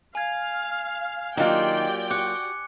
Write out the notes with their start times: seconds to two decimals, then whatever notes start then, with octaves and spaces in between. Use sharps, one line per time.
0.15 F5 G#5 G#6
1.37 D#3 F#3 A#3 F4 G4 D5 G5 G7
2.11 F#4 D6 F#6 C#7